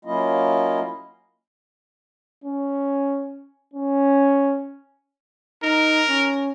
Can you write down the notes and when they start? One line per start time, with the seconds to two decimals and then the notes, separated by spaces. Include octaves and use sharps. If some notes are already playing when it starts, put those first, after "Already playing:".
0.05 F#3 A#3 C#4 E4 F4 D#5
2.44 C#4
3.73 C#4
5.63 D#4 A#4
6.09 C#4